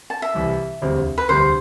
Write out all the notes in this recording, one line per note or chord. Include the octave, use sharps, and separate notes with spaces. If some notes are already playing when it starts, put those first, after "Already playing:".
A5
E5
C2 C3 E3 G3
E1 D2 C3 G3 C4
B4
E1 D2 C3 G3 C4 C5